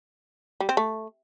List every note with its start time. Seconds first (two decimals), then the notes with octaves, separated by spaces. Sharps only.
0.60 G3
0.69 C4
0.77 A3